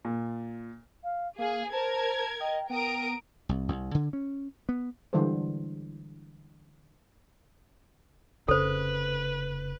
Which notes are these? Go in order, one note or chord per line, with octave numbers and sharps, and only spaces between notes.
A#2
F5
A#3 G#4 F5
A#4 C5 A5 G#6
D#5 G5
B3 A#4 G5 D#6 D7
C2
C2
D3
C#4
B3
D3 E3 G3 G#3 A4 C5
F1 C#3 A4 B4 C5